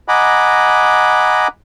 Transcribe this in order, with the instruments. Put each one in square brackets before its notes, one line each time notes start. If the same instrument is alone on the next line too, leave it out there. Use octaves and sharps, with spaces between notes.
[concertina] D#5 F#5 G#5 A#5 B5 D6